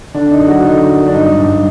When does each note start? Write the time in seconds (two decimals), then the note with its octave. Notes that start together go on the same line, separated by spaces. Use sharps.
0.14 D3 D4
0.31 D#4
0.39 F#2
0.48 F#4
0.64 D3 D#4
0.89 F#2
1.07 D4
1.14 G2 D#4
1.38 G2